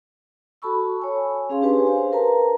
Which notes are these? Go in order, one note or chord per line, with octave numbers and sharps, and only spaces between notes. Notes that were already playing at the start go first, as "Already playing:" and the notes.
F#4 A4 A5 B5 C#6 E6
C#5 G#5
C#4 G#4 F5 C6
D4 G4 B4 G#5 C6
C5 F5
A#4 B4 A5 A#5